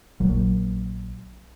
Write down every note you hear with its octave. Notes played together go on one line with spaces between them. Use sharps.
A#1 F#3